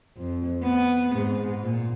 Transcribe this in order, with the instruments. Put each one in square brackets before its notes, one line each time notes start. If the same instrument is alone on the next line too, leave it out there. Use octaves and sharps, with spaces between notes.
[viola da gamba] F2
B3
G#2
A#2